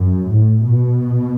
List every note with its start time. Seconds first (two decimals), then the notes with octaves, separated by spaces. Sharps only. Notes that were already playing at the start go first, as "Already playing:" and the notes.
Already playing: F#2
0.30 A2
0.65 B2